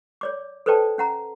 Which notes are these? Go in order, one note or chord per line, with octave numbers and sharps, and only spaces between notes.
C#5 D5 D6
A4 B4 C5 D5 G5 A5
C#4 F#5 A#5